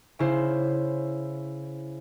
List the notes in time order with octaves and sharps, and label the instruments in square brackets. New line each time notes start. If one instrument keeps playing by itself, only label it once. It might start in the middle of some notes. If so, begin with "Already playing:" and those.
[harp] C#3 E4 C5